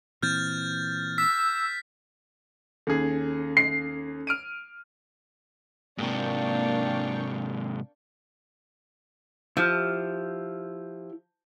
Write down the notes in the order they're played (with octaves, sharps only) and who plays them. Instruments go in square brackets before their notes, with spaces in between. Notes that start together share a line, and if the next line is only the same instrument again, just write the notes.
[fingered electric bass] A#2 E3 C4 [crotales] F6 G6 A6
[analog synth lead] E6 [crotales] B6
[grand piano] D#2 G#4 [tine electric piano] C#4 A4
[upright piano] C7
[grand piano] F6 D7 D#7
[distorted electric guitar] G#2 C3 [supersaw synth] A#3 G5 C#6 [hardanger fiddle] D4 F5
[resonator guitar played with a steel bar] F3 [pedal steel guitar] E4 G4 F6